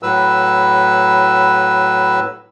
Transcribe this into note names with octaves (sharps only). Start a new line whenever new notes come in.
A2 F#3 B4 E6